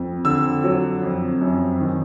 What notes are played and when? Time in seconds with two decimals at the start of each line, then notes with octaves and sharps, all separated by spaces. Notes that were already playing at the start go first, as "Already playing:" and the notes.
Already playing: F2
0.25 D3 E6
0.64 F#3
1.03 F2
1.41 F#2
1.80 D#3